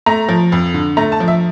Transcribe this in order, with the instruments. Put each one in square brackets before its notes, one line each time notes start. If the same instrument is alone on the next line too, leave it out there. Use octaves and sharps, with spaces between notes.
[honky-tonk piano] A3 A#5
F3
F2
D3
A3 A#5
A5
F3
E5